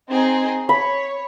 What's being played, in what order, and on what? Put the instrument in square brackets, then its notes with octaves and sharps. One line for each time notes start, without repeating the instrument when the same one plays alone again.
[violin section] C4 D#4 G#4
[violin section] C#5 [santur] B5